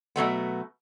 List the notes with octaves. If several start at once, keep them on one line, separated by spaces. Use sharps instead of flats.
B2 F#3 A3 B3